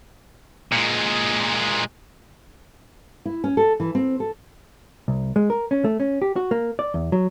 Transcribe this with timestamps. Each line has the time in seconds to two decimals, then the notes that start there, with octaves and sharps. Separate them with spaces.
0.72 A#2 G#3
3.25 E4
3.44 C#4
3.57 A4
3.80 E3
3.95 C4
4.20 A4
5.08 C2
5.36 G#3
5.50 A#4
5.71 C#4
5.84 A3
6.00 C#4
6.22 G4
6.36 F#4
6.51 A#3
6.79 D5
6.94 E2
7.12 F#3